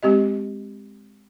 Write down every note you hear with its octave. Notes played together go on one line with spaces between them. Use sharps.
G#3 C4 G4 D#5